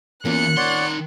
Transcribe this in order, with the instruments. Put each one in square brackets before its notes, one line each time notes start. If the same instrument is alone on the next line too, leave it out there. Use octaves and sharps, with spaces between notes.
[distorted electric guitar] E2 [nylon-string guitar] A#3 C#4 F4 [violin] F#6 C#7
[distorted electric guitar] D#3 C6 [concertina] C#5 D5 F#5